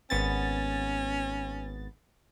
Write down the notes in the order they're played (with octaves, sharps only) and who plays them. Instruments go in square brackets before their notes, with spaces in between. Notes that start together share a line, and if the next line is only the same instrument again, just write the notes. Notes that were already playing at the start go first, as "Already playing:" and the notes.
[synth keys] G#1 B3 A6 [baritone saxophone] C#4